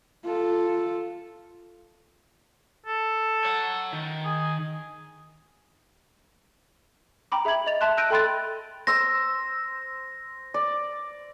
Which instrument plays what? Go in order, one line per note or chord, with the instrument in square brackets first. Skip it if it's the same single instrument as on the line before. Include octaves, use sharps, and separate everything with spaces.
[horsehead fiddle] F4 A4
[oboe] A4
[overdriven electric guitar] C#5 F#5
D#3
[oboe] G#4
[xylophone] G5 A#5 B5 D6
G#4 E5 B5 G#6 F#7
D#5 A6 F7
E5 A5 C6 F#6
E6 F#6 G6 A#6 D7 D#7
A4 G5 B5 C6 F#6 A6
[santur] C5 E6 [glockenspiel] A#6
[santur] D5